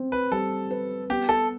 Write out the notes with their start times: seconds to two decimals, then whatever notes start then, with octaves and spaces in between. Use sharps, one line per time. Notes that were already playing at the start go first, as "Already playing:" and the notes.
Already playing: C4
0.12 B4
0.31 G3 A4
0.71 B4
1.10 B3 G4
1.29 A4